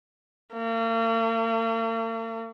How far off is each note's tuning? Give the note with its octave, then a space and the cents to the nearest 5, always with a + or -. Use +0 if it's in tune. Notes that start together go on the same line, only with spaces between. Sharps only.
A#3 -45